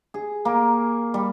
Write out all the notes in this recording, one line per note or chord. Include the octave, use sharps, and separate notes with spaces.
G#4
A#3
G3